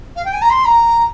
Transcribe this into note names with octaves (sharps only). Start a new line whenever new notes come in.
F5
G5
G#5
A#5
C6
A#5